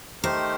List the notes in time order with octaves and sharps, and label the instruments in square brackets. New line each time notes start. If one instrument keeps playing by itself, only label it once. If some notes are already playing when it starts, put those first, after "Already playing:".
[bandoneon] D#3 A3 D#4 G4 A#4 [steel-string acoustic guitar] C5